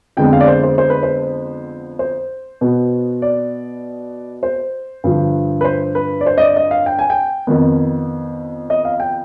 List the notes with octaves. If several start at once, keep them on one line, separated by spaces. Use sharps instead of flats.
F2 D3 G#3 B3 G5
F5
D5
C5
C5
C5
B4
C5
C5
B2 B3
D5
C5
G2 D3 F3
B4
C5
B4
D5
C5
D#5
D5
D#5
F5
G5
G#5
G5
F2 D#3 B3
D#5
F5
G5